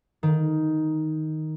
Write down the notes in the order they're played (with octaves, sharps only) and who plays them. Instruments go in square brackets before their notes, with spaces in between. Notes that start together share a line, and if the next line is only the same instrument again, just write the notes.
[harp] D#3